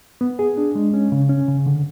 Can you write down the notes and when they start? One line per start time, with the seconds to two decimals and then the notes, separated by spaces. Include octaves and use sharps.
0.21 B3
0.39 G#4
0.57 D4
0.75 G#3
0.94 C#4
1.12 C#3
1.29 C#4
1.48 C#3
1.66 D3